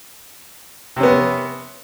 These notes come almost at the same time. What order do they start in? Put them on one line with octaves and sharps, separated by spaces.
C3 C#4 B3